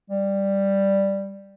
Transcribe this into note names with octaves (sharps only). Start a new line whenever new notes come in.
G3